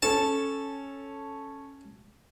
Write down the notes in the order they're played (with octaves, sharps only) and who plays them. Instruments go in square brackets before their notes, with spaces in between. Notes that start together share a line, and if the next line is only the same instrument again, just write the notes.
[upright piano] C#4 A4 [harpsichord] A5